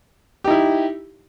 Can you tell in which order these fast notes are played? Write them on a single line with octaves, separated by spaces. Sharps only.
G4 D#4 E4